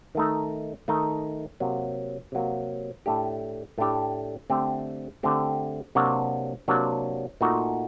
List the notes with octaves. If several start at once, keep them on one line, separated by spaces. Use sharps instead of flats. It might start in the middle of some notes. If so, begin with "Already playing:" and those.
D#3 A3 D#4
D#3 A3 D#4
C3 F#3 A#3
C3 F#3 A#3
A2 A3 D4 G4
A2 A3 D4 G4
D3 A3 C4 G4
D3 A3 C4 G4
C3 F#3 A#3 D4 F#4
C3 F#3 A#3 D4 F#4
A#2 A3 D#4 F#4